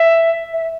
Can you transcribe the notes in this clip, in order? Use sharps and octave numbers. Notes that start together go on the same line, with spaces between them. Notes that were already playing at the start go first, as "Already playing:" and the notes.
Already playing: E5
E5